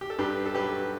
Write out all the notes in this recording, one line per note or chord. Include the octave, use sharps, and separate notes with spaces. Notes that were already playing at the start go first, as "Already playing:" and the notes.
G4
A4
G2 G4 B4
A4
F#3 G4 B4